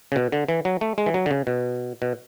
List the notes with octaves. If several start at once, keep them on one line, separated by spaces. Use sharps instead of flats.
C#3
B2
D3
E3
F#3
A3
G#3
E3
F#3
D3
C#3
B2
B2